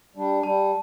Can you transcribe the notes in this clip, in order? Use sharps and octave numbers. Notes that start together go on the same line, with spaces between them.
G3 D4
G3 A5